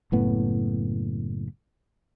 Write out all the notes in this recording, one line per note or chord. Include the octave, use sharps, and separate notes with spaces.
F#1 A2 B3